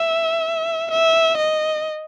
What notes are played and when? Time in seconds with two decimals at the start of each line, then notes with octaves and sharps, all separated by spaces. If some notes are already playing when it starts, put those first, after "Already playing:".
Already playing: E5
0.91 E5
1.38 D#5